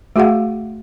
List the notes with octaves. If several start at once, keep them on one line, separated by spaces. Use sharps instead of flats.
A3 F#4 G#4 F5 F#5